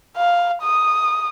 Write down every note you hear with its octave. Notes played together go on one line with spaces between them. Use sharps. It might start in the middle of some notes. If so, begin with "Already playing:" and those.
F5
D#6